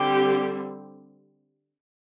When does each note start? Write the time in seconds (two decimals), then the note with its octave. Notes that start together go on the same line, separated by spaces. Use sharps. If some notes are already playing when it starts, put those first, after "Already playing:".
Already playing: D3 G3 C4 G4